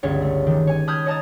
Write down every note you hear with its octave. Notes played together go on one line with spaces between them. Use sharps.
G1 C#2 C#5
A3
D3 D#3
C#5 G#5
A5 B5 D#6 F6 G6 G#6
C#5 D#5 A5 A#5 D#6 A6